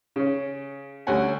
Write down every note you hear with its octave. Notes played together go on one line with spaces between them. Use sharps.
C#3 C#4
D2 G3 C#4 F#5 G#5